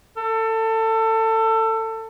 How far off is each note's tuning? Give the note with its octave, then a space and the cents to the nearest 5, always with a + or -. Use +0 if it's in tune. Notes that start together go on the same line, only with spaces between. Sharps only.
A4 +25